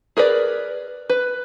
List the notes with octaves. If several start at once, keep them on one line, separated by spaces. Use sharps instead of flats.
G#4 A#4 B4 D5
B4